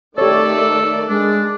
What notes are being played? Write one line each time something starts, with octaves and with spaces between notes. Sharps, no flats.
D#3 A3 G4 A4 C#5 D5
G#3 D4